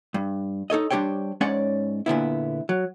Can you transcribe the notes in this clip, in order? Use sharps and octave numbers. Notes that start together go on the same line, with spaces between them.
G2
D#4 A4 C#5 D#5
G3 D4 G4 C5 C#5 G5
G#2 C#4 C#5 D5 F#5
A#2 D3 B3 E4
F#3